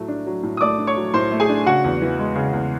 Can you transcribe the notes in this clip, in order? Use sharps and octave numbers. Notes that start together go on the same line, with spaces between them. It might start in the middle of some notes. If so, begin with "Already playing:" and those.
Already playing: A2 F#3 A3
D4
F#3
A2
D#6
A3 D5 D6
D4
C#5 C#6
F#3
A2 C5 C6
A3
G#4 G#5
D4
C#3 F#4 F#5
E2
E3
G#3
C#3
E2